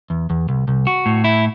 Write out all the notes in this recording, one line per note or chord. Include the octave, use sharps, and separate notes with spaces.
E2
E2
C2
C2
F#4
A2
E4